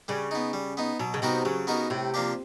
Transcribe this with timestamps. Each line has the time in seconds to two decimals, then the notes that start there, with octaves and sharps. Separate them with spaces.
0.08 C#3 G3
0.31 B3 D#4
0.53 G3
0.77 B3 D#4
0.99 B2 F#3
1.14 C#3
1.22 C3 B3 D#4 F#4 A#4
1.45 C#3 F#3
1.67 B3 D#4 F#4 A#4
1.90 A2 C3
2.14 F3 A#3 D4 G4